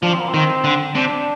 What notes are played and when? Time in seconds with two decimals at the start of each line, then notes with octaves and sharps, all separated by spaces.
0.03 F3 D4
0.12 C4
0.20 A#3
0.28 C4
0.34 D#3
0.64 D3
0.95 C3 D4